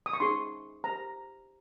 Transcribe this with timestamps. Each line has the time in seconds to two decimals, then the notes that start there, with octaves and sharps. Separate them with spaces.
0.06 D#6
0.13 C#6
0.20 D#4 G#4 C5 C6
0.84 G4 C5 A#5